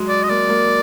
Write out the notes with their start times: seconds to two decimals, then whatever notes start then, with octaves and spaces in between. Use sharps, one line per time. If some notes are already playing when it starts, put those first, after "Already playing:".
Already playing: F#3 G#3
0.08 D5
0.23 D#5
0.29 A#3 D5
0.49 A#3